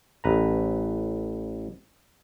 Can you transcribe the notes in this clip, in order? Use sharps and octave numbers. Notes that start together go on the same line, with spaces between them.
A1 B4 A#5